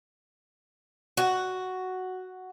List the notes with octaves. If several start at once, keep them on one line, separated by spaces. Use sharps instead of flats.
F#4